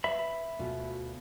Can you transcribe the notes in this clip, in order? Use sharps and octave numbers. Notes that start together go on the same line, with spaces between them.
B4 E5 B5
D2 B2 F4